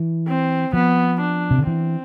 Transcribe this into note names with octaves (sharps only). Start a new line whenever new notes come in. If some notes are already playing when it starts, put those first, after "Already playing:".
Already playing: E3
C4
F3 B3
D4
C3
D3
E3 C4